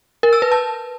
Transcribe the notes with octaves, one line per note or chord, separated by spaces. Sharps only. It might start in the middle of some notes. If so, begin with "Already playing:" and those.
A#4
E6
B4
A5